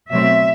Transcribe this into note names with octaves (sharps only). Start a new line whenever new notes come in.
B2 F#3 A3 C4 E5